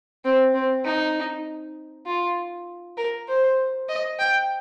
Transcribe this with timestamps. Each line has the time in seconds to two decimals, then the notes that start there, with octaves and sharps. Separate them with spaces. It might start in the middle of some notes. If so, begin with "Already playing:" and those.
0.24 C4
0.54 C4
0.85 D#4
2.06 F4
2.97 A#4
3.28 C5
3.89 D#5
4.19 G5